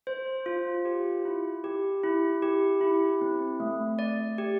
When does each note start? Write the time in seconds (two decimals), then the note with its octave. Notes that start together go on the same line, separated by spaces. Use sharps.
0.07 C5
0.46 F4
0.85 G4
1.25 E4
1.64 G4
2.04 E4
2.42 G4
2.81 E4
3.21 C4
3.60 A3
3.99 D5
4.38 G4